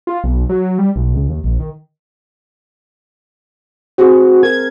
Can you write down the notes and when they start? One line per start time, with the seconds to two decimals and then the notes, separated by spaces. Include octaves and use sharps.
0.07 F4
0.24 B1
0.49 F#3
0.78 G3
0.96 B1
1.15 C#2
1.29 D#2
1.44 A#1
1.60 D#3
3.98 C4 F#4 G#4 C5
4.43 A#4 G#6